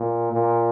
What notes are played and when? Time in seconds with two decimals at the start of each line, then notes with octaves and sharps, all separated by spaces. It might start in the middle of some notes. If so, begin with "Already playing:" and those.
Already playing: A#2
0.32 A#2